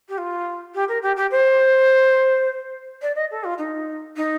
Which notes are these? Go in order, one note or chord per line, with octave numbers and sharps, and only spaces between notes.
G4
F4
G4
A#4
G4
G4
C5
D5
D#5
A4
F4
D#4
D#4